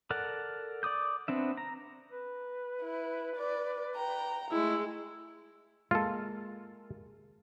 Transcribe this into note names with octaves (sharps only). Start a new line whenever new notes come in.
A4 A#4 D5 F#5
D5 D6 D#6 G6
B3 C4 D4 E5
A#5
B4
E4
D5
G5 A#5
G#3 A3 E4
G#3 A#3 F4 A4